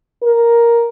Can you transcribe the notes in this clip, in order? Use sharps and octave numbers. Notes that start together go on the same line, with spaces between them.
A#4